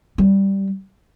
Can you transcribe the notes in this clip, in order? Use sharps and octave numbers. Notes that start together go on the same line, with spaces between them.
G3